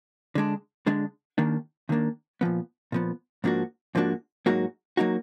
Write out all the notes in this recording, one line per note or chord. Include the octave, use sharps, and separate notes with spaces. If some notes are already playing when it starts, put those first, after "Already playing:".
D3 G#3 D4
D3 G#3 D4
D#2 D#3 A#3 D4
D#2 D#3 A#3 D4
A#2 F3 B3
A#2 F3 B3
G#2 F3 A#3 D4 F#4
G#2 F3 A#3 D4 F#4
G#2 F#3 A#3 D#4 F#4
F#3 A#3 D#4 F#4